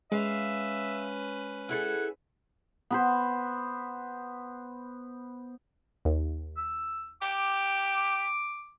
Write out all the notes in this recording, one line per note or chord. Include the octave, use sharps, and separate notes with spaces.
G#3 C#4 B4 E5 F5
E4 G#4 A4 F#5
B3 B4 C5
D#2
E6
G4 D6